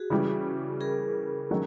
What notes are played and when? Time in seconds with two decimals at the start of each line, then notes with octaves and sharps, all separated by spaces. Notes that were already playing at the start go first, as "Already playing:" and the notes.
Already playing: F#4 G#4
0.10 C#3 E3 G3
0.80 G#4 A#4
1.51 D#3 F#3 A3 C#4 F#4